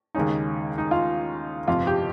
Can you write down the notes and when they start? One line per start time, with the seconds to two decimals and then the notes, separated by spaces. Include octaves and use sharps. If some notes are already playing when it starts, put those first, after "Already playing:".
0.15 D#2 C#3 G#3 C#4 D#4
0.78 D#4
0.91 F4
1.67 G1 F2 C3 F4
1.87 G4